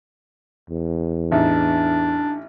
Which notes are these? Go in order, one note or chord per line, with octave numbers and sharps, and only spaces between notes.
E2
A1 D4 D#4 E5